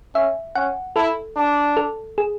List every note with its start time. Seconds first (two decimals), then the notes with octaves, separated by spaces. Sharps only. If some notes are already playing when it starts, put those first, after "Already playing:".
0.15 C#4 E5
0.55 C#4 F#5
0.96 E4 A4
1.36 D4
1.77 A4
2.18 G#4